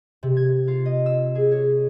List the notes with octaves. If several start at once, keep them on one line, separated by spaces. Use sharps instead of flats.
C3
G#6
F4
D#5
E6
G#4
C#5